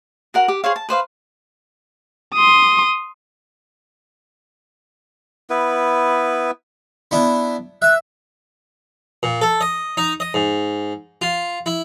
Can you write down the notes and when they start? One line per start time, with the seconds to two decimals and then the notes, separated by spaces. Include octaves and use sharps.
0.34 F#4 A#4 F#5
0.48 G4
0.64 G#4 C5 C#5 F5
0.76 A5
0.89 B4 C5 D5 F5
2.34 C6 D#6
5.50 B3 E4 B4
7.11 B3 D4 E4
7.82 E5 F#6
9.23 A#2
9.41 A4
9.61 D#5
9.97 D#4
10.20 D#5
10.34 G#2
11.22 F4
11.66 E4